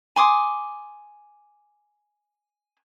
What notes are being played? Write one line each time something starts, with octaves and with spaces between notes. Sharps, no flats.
G#5 C6 D6 D#6